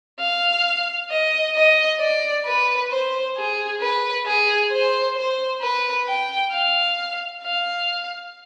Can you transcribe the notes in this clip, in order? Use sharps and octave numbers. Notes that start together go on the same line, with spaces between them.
F5
D#5
D#5
D5
B4
C5
G#4
B4
G#4
C5
C5
B4
G5
F5
F5